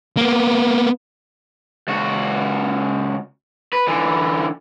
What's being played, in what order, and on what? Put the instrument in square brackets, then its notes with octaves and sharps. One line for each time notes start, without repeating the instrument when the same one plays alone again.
[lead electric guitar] A#3 B3
[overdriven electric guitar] C#2 F#4
B4
D3 E3